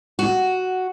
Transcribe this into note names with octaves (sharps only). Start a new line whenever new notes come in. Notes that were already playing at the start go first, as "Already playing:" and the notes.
F#4